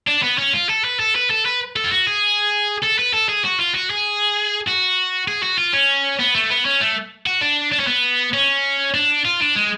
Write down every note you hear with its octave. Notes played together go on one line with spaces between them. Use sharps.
D4
B3
C#4
F4
A4
B4
A4
B4
A4
B4
A4
F4
F#4
G#4
A4
B4
A4
G#4
F#4
F4
F#4
G#4
F#4
G#4
F#4
F4
C#4
B3
A3
B3
C#4
A3
F#4
D4
D4
C#4
B3
C#4
D4
F4
D4
G#3